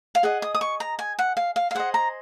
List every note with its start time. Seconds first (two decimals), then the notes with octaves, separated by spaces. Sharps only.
0.15 F5
0.23 G#4 D#5 F#5
0.42 D#6
0.55 D#6
0.61 C#6
0.80 A#5
0.99 G#5
1.19 F#5
1.37 F5
1.56 F5
1.71 F5
1.75 G#4 C5 D#5 F#5
1.94 A#5